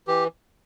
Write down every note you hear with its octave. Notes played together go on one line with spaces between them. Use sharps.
E3 G4